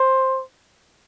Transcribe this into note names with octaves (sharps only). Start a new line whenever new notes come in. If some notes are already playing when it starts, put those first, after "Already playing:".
Already playing: C5